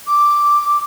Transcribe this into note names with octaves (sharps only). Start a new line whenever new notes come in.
D6